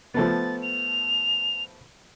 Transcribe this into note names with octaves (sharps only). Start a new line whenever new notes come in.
F3 A3 B3 A6
F7